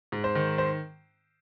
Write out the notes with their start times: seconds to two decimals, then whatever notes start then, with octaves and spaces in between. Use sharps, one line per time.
0.12 G#2
0.24 C5
0.35 D#3
0.58 C5